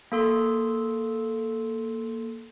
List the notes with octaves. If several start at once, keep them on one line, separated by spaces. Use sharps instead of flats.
A#3 A4 C6